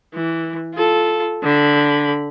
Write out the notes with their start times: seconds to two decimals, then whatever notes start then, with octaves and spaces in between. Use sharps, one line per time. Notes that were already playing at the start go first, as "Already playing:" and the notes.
0.14 E3
0.74 F4 A4
1.43 D3 B5